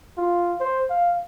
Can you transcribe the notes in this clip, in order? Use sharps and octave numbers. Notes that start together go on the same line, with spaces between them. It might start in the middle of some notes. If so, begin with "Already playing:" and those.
F4
C5
F5